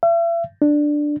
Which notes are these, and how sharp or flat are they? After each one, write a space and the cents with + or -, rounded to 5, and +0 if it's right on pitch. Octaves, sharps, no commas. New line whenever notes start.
E5 +40
D4 +5